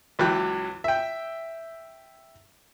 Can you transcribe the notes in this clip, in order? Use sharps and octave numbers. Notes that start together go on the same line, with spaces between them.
C#2 E3 F#3 G5 F#6
E5 G5